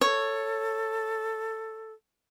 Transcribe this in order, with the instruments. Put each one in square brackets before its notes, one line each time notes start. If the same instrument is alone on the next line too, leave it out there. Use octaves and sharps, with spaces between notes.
[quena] A4 [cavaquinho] C#5